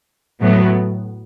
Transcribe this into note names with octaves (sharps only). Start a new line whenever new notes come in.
A2 F#3 B3